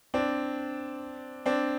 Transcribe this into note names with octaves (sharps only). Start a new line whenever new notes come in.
C4 D4
C4 D4